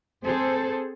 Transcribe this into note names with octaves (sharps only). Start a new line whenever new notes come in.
C4 G#4 A4 C5